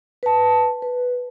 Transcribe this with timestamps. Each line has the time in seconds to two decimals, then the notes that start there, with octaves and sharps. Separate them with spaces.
0.23 B4 A5
0.82 B4